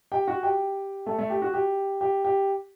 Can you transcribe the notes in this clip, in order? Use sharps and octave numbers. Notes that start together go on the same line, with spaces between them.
G4 G5
F#4 F#5
G4 G5
A3 A4
A3 A4
G4
F#4
G4
G4
G4